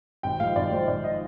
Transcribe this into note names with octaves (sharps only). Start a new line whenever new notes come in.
G#1 G5
G#2 F3 F5
G#1 D5
G#2 F3 C5
G#1 D5
F3 D#5